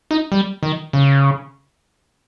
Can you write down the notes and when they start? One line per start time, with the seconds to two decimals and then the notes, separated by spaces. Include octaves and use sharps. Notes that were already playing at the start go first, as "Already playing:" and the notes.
0.11 D#4
0.32 G3
0.63 D#3
0.93 C#3